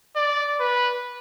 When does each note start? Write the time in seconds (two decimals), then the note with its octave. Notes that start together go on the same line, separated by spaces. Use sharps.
0.16 D5
0.60 B4